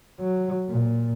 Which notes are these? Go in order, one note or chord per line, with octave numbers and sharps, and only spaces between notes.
F#3
A#2